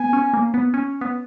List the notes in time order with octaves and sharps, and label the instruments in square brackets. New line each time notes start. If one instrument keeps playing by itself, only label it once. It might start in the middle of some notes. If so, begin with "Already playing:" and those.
Already playing: [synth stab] B3 [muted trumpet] G#5
[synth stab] C#4
A#3
B3
C#4
B3